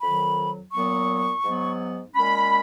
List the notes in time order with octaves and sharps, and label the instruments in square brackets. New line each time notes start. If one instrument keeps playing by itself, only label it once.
[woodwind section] F2 D#3 F#3 B5
A#2 F#3 B3 C#6
G#2 F#3 B3
A#2 G#3 C#4 B5